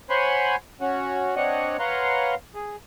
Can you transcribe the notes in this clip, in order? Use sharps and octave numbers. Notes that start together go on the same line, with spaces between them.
C5 C#5 F#5 G#5 B5 C6
C#4 F#4
C4 D4 C#5 D#5 F#5
B4 C#5 F5 F#5 A#5 C6
G#4